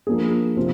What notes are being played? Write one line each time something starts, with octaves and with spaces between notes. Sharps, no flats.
F3 A#3 D4 G#4
C3 F3 C4 F4